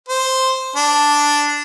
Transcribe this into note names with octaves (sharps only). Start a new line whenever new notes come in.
C5
D4